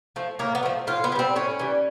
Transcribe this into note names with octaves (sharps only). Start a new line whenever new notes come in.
F3 A3
A2 A#3
B3
F3 A3
A2 F4
B3
E3
G3 C4
A2 C#4
E3 G3